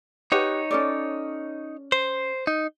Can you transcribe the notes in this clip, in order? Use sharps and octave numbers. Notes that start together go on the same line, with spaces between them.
D#4 G4 B4 C#5 F#5
C#4 A4 D5
C5
D#4